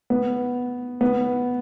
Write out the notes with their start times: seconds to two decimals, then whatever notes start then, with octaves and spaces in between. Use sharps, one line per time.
0.10 B3
1.01 B3